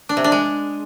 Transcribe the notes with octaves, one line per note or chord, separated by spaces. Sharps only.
D4
C3
D4
G#3